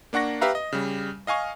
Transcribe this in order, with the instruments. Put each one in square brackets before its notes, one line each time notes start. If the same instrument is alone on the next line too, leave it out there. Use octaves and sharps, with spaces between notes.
[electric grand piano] A#3 D4 F#5 C#6 A#6
G4 B4 E5 F5 A#5
D#5
C#3 G3
D#5 F5 G#5 C#6 F6